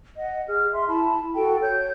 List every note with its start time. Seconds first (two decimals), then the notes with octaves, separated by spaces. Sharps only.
0.17 D#5 F#5
0.48 G#4 F6
0.72 E5 C6
0.88 E4 A5 B5
1.36 F#4 A4 G5
1.61 C#5 G6